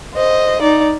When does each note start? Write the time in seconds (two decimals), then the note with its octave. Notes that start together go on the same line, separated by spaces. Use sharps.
0.13 C5 D#5
0.62 D#4 D5